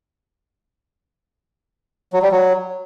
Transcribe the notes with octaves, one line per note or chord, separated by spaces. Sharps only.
F#3
G3
F#3